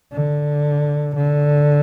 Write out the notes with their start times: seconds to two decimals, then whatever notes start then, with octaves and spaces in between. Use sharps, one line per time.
0.12 D3
1.15 D3